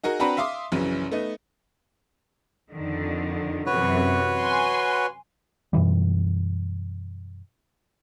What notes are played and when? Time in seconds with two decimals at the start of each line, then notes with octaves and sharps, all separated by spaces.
0.04 D#4 F#4 G#4 A#4
0.20 C4 D4 F#4 B4 A#5 B5
0.37 E5 F5 C6 D6 D#6
0.72 A#1 F#2 C#3 E3
1.11 A3 B3 D#4
2.70 F2 D3 D#3
3.66 F#2 C3 E3 F#4 B4 C#5
4.38 G#5 C6
5.73 F#2 B2 E3 G3